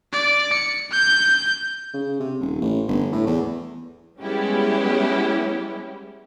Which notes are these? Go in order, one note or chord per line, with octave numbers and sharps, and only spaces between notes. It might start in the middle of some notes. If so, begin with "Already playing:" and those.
D5
C#7
G6
C#3
C3
D#1
A1
G1
A2
E2
G3 G#3 B3 C#4 E4 G4